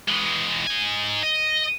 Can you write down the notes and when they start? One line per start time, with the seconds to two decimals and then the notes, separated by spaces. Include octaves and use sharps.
0.08 E3 G#3
0.67 D#4 G#5
1.23 D#5